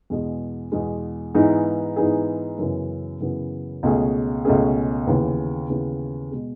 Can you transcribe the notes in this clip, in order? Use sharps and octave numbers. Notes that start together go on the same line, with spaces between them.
E2 B2 G#3
E2 B2 G#3
G#2 E3 B3 D#4 G#4
G#2 E3 B3 D#4 G#4
F#2 C#3 E3 B3
F#2 C#3 E3 B3
C#2 B2 A3 C#4 G#4
C#2 B2 A3 C#4 G#4
D#2 C#3 E3 B3
D#2 C#3 E3 B3
B2 G#3